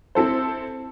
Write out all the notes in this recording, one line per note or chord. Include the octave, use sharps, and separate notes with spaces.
C4 E4 A4 C5